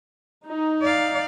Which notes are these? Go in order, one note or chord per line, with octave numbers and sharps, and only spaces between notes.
D#4
D5 F5